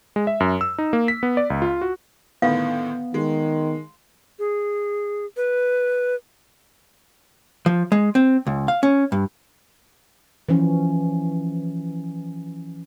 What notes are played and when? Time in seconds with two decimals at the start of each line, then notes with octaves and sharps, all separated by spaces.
0.16 G#3
0.27 E5
0.40 F#2
0.61 E6
0.78 D#4
0.93 A#3
1.08 B6
1.23 B3
1.37 D5
1.50 C#2
1.62 F4
1.81 F#4
2.42 A2 D3 D#3 B3 F5
3.14 D#3 G#3
4.39 G#4
5.37 B4
7.66 F3
7.92 G#3
8.15 C4
8.47 C#2
8.68 F5
8.83 C#4
9.12 G2
10.49 E3 F3 C#4